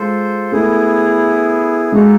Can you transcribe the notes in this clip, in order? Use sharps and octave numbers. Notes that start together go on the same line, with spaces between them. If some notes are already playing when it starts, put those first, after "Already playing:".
Already playing: G#3 F4 A4 C5
A3 B3 E4 G#4
G#3 A#3 D#4 F#4 A4